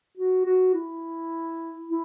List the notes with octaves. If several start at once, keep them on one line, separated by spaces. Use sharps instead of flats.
F#4
F#4
E4
E4